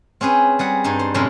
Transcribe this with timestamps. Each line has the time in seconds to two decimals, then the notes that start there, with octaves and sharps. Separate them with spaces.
0.21 C4 C#4 G#4 B4
0.59 G3 G#4 F#5
0.84 G2 D4 D#4
0.99 C5
1.14 F#2 A2 C3 G#3 C#4 D4